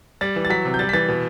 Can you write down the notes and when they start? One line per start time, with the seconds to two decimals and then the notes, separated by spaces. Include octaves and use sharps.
0.21 G3 A6
0.36 E3
0.45 A6
0.50 F#3 B6
0.65 C3
0.74 G6
0.79 G3 A6
0.89 B6
0.93 E3 A6
1.08 B2